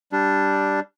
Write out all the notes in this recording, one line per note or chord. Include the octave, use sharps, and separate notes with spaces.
G3 D4